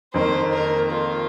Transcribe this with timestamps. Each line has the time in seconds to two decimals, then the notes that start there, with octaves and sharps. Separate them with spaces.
0.14 F2 D#3 A#3 C5
0.52 A#4
0.91 F4